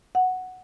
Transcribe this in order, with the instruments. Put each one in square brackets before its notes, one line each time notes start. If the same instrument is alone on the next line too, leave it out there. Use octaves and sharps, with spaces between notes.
[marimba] F#5